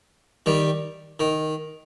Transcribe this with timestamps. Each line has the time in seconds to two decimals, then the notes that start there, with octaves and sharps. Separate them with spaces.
0.46 D#3 G3
1.20 D#3